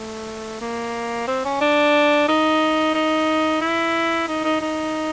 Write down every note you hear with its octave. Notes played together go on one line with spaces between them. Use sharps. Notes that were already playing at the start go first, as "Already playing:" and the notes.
Already playing: A3
A#3
C4
C#4
D4
D#4
D#4
E4
D#4
D#4
D#4